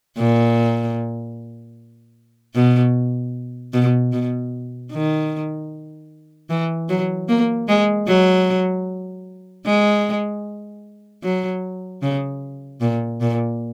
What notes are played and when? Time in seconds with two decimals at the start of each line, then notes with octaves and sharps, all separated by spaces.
0.18 A#2
2.55 B2
3.73 B2
4.13 B2
4.92 D#3
6.50 E3
6.89 F#3
7.29 A#3
7.68 G#3
8.07 F#3
9.66 G#3
11.23 F#3
12.02 C#3
12.81 A#2
13.21 A#2